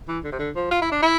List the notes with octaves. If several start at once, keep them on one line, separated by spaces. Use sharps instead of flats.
E3
D3
C3
D3
F3
F4
E4
D4
E4